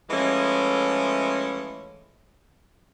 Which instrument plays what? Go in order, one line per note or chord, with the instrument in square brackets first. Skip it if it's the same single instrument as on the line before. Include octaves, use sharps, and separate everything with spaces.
[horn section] E3 F3 G#3 A3 C#4